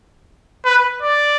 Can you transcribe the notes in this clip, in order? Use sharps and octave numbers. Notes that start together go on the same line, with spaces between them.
B4
D5